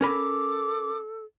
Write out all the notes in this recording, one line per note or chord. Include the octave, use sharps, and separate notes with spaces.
C#4 A4 A#4 B5 D6